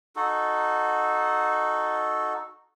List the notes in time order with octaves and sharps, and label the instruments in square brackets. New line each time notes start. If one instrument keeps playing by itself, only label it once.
[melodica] D#4 F#4 A4